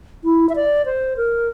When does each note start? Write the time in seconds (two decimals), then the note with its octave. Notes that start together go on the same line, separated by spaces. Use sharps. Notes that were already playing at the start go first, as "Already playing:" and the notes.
0.24 E4
0.49 E5
0.56 D5
0.85 C5
1.17 A#4